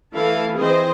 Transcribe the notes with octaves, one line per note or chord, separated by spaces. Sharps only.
E3 A3 E4 F5 A5
E3 C4 G#4 C5 D#5